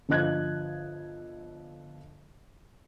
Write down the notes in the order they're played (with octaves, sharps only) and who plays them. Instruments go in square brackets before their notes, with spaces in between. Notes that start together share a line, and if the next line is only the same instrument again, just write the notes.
[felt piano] G1 D3 F3 D#5 F#6 G#6